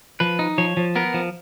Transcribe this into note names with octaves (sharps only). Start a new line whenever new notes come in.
F3 B4
D#4
F3 C#5
F3
B3 A#4
F3